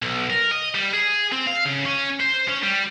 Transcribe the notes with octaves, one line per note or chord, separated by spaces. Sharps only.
B1
A#4
D#5
G3
G#4
C4
F5
C#3
C#4
C5
C#4
G3